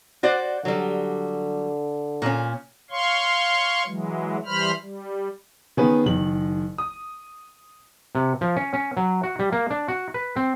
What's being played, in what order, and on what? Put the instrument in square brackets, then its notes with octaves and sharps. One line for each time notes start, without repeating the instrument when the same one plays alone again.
[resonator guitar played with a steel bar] F#4 C5 D5
[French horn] D3 [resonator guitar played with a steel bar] F#3 G3
[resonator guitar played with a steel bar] A#2 C#4
[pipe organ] C#5 F5 C6 C#6
E3 F#3 G#3
E3 G3 C5 B5 F6
G3
[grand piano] D#3 B3 C#4 G#4 B4
F#1 D#3 F#7
D#6
[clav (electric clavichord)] C3
F3
C#4
C#4
F#3
F#4
G3
A#3
D4
F#4
B4
C4